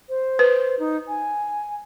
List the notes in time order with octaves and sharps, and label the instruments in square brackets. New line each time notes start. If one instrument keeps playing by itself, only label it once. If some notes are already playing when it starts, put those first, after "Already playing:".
[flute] C5
[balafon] B4
[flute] D#4
G#5